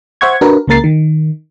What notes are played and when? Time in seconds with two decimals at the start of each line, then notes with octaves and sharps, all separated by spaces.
0.21 C5 E5 F#5 C#6 G#6
0.41 D4 F#4 A#4 B4
0.67 C#2 C#3 A#3 A#4 A6 C7
0.84 D#3